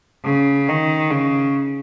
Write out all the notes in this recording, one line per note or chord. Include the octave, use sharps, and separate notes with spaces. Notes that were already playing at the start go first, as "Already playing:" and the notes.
C#3
D#3
C#3